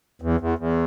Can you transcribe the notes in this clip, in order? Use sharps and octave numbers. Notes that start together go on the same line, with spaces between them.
E2
E2
E2